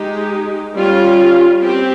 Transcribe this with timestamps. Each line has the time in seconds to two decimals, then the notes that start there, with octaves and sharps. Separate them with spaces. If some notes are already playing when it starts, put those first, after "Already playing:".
Already playing: G#3 D#4 G4
0.75 G3 C#4 F4
1.63 C4 G4